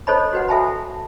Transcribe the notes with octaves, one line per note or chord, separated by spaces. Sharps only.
A4 C5 C#5 D#5 A5 B5
F#4 B4 F#5
A4 E5 G#5 A5 B5